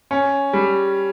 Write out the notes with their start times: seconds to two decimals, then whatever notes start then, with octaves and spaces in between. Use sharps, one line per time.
0.11 C#4
0.53 G3